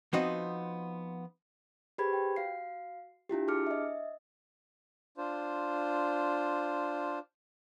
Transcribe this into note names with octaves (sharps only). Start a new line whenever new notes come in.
F3 B3 C4 D#4 F#4
G4 G#4 B4 C5 B5 G#6
G5
F#4 F5 C7
D4 E4 F4 G4
D4 G#4 A5 D6 F6 C#7
D#5 E5
D4 F4 C5